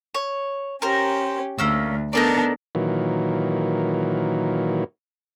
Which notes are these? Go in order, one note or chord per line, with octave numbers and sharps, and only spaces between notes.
C#5
C#4 G4 A#4 C5
D2 A#3 C#4 E6
B3 D4 D#4 A4 A#4 D5
A#2 D#3 E3 F#3